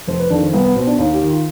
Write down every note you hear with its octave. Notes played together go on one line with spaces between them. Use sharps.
F1 C5
B4
F2 D#3 D4
C4
C2 B3
B3
B2 C4
D4
D#2 D#4
G4
D#3
F4